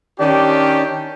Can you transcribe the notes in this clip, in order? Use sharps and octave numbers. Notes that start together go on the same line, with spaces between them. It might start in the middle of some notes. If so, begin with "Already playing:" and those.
D#3 C#4 D4 G4